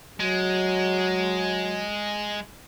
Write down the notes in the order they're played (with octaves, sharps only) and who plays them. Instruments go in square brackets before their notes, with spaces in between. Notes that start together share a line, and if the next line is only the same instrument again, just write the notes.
[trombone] F#3 [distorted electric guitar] G#3